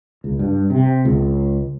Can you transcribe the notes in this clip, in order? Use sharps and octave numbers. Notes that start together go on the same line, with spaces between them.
C#2
G2
C3
C#2